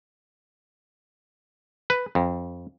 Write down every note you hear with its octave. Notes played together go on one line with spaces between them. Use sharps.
B4
F2